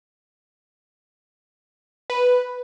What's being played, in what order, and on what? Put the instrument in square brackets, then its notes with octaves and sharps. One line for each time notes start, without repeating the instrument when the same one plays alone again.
[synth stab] B4